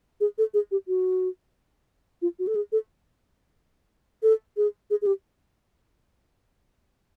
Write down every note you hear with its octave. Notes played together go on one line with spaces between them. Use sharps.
G#4
A4
G#4
G4
F#4
F4
F#4
A4
G#4
A4
A4
G#4
G#4
G#4
G4